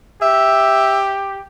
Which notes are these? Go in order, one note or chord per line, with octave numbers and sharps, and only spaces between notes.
G4 E5